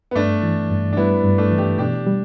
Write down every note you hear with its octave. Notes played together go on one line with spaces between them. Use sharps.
B3
G2 A3 D4
E3
G2
D4
G3 B3 E4
G2
A3 D4
E3
D4 G4
B2 D4 G4
G3